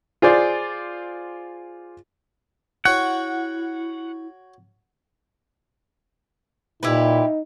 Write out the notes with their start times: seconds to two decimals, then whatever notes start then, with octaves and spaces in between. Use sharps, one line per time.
0.22 F4 G#4 C5 D5
2.85 E4 F#4 C#5 F#5 G5
6.83 A#2 D#4 E4 G4 B4